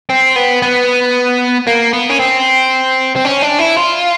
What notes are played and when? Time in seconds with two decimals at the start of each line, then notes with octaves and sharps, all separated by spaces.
0.10 C4
0.36 B3
0.62 B3
1.67 A#3
1.93 B3
2.10 C#4
2.20 C4
3.16 C4
3.25 C#4
3.42 D4
3.59 E4
3.77 F4